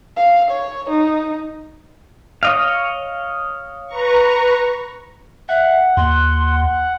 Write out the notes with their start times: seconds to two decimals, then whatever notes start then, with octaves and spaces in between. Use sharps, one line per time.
0.17 F5
0.51 C#5
0.90 D#4
2.43 C#5 D#5 F5
3.87 B4 A#5 C#6
5.49 E5 F#5
5.97 D#2 C6